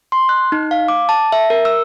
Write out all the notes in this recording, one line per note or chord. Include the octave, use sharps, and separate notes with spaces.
C6
F#6
D#4
F5
D6
A5
E5
A#4
E6